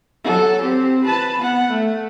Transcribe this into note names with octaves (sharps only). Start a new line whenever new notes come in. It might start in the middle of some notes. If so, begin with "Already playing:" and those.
F#3 A4
C4 G4
B4 A5
B3 F#5
A3